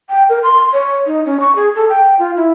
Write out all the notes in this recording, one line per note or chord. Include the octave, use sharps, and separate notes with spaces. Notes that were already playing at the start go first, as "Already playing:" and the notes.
G5
A#4
C6
C#5
D#4
C#4
C#6
G#4
A4
G5
F4
E4